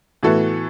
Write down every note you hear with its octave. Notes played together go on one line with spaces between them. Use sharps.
A2 E3 B3 F#4 A4